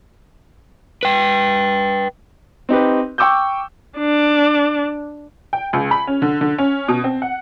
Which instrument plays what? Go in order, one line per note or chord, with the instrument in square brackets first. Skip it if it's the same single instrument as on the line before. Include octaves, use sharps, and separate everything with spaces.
[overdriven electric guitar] B4 G5
[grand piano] C4 D#4 G4 B4
G5 C#6 D6 E6 G6
[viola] D4
[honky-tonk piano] G5
C#2
B5
C#4
D3
D3
C#4
B2
C4
F#5